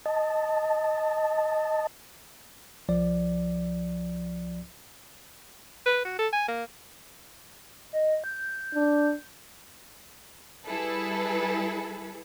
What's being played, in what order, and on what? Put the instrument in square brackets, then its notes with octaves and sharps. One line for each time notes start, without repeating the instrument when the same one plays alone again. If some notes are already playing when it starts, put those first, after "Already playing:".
[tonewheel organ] D#5 A5
[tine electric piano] C2 F3 D5
[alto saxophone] B4
F#4
A4
G#5
A#3
[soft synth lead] D#5
G6
[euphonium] D4
[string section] G3 E4 G#4 A4 B4